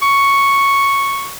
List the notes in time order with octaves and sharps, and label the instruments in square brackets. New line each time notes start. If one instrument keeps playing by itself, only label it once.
[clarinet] C#6